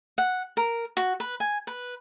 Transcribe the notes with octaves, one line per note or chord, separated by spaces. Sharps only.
F#5
A#4
F#4
B4
G#5
B4